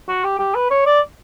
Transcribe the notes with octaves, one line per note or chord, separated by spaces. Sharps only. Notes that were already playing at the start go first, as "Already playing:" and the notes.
F#4
G4
G4
B4
C#5
D5